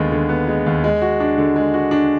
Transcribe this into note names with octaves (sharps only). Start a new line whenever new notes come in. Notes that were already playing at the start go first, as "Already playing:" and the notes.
Already playing: D#2 D3 G#3 B3
D3
B3
G#3
D#2
G#3
F#4
D4
D3
G#3
F#4
D4